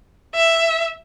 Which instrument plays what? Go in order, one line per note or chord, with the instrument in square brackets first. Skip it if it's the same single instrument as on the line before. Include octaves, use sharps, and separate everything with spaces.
[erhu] E5